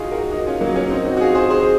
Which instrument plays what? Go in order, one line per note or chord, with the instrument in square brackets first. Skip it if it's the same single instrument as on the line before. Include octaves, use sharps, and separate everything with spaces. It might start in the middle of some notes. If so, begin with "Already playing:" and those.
Already playing: [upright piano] D#4 F4 F#4 G#4
F#4 A#4
D#4 F#4
C#4 F4
F#3 A#3
A#3 C#4
C4 D#4
D#4 F#4
F#4
F4 G#4
G#4 C5
G#4 C5